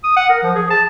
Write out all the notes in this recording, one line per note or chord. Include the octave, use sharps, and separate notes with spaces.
D#6
F#5
A#4
F3
G#4
A5